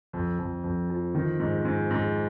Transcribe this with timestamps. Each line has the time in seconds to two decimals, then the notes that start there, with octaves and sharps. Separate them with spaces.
0.13 F2
0.39 F2
0.64 F2
0.90 F3
1.15 D#3
1.40 G#2
1.65 G#2
1.91 G#2